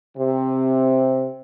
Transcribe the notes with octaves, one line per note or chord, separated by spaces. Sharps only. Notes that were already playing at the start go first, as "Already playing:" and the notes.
C3